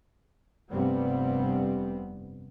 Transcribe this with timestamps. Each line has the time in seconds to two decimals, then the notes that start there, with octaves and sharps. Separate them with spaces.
0.72 F1 G2 C3 G3 B3 C4